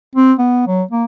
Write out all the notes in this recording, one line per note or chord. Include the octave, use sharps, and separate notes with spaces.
C4
B3
F#3
A#3